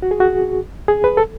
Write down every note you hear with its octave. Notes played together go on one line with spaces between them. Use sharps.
F#4
G#4
F#4
G#4
B4
A4